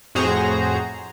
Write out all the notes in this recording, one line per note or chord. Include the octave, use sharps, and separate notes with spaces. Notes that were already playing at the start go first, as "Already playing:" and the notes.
F2 A2 F#4 G#4 C5 A#5